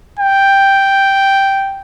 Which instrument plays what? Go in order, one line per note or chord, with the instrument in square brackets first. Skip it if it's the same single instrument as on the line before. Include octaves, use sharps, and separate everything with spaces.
[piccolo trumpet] G5